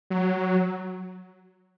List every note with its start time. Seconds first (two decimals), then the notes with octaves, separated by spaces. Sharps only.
0.10 F#3